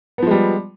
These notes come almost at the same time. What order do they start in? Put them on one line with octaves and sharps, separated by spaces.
B3 F3 G#3 G3